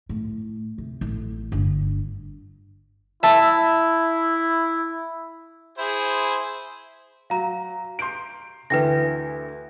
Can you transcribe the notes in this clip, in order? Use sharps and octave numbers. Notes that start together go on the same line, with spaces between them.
A2
C3
A1
G1
E4 E5 A5
E4 G#4 C5
F#3 F5 A#5
C6 G6 D7
D2 E3 B4 E5 G5 A#6